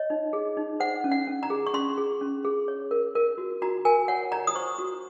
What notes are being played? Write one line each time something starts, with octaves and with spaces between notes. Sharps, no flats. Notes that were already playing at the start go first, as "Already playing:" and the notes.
Already playing: C#5 D#5
D#4
G#4
D#4
C5 F#5
C#4
F#5
C#4
A#5
G#4
C#6
C#4 C6
G#4
C#4
G#4
C#5
A#4
A#4
F#4
F#4 A#5
A#4 G#5
C#5 F#5
C#5 A#5
D#6
C5 C#6
F#4